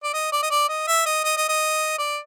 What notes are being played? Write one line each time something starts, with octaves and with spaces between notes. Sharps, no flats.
D5
D#5
D5
D#5
D5
D#5
E5
D#5
D#5
D#5
D#5
D5